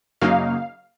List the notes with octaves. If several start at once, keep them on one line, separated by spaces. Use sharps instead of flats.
F#2 C#3 F#3 A#3 D#4 F5